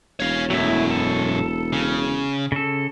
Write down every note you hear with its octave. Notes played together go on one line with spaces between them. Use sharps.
E1 C#5 F5
F#2 B2 F#3 A3 E4
A4
C#3
C#3 A4